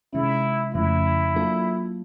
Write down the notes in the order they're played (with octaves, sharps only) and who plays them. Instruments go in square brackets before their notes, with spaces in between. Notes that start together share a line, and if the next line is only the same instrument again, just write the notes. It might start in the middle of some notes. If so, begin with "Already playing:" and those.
[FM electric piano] C3 D#3 G#3 C#4 [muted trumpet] E4
[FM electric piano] F2 C#3 F3 A3 C#4 [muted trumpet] E4
[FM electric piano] F#3 A#3 D4 F4 A4